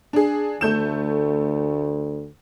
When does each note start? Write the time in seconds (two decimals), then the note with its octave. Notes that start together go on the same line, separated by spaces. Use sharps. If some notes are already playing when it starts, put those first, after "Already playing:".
0.13 D4 G#4
0.61 D2 A3 G6 E7